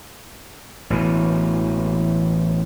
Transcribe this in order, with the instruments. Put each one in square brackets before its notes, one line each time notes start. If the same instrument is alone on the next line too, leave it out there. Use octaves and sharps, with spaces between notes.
[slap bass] A1 B2 E3